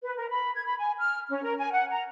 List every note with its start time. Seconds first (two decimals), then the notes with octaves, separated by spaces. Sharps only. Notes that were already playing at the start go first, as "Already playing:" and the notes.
0.03 B4
0.17 A#4
0.30 B5
0.54 G#6
0.66 B5
0.79 G#5
0.99 F6
1.29 C#4
1.42 A#4
1.58 G#5
1.71 F#5
1.91 A#5